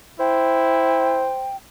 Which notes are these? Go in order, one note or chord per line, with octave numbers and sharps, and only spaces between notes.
E4 C5 G5